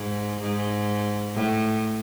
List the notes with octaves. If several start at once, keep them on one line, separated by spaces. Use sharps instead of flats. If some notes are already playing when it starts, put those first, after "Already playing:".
Already playing: G#2
G#2
A2